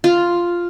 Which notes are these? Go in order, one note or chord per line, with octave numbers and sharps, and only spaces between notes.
F4